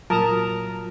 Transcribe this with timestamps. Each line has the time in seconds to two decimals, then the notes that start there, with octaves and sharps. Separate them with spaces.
0.10 A#2 F#3 F4 A#4 A5 A#5 D#6